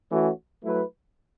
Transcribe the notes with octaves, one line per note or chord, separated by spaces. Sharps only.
E3 A3 C#4 F#4
F#3 A3 E4 B4